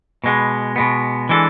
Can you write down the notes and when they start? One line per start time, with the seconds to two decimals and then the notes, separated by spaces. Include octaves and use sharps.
0.24 B2 G#3 B3
0.76 B2 G#3 B3
1.29 E3 G#3 D4 A4